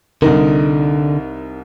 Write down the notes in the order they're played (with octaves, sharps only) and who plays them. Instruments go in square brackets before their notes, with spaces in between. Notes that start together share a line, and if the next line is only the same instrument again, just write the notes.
[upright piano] C2 D#4 A#4 [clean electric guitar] D3